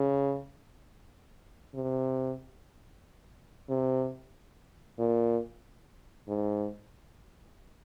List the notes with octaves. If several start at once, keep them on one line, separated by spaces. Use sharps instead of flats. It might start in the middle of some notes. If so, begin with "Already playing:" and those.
Already playing: C#3
C3
C3
A#2
G#2